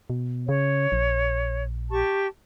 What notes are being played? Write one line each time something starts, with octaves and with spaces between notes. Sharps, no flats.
B2
C#3 C#5
A#1
G4 A5 C#6